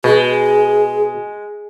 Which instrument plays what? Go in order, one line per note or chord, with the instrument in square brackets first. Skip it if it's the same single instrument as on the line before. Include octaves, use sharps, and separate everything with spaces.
[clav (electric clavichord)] B2 [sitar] G#3 [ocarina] G#4